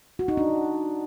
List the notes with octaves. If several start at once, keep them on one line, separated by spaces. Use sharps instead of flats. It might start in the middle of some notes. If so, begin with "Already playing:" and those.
F#4
D#4
D4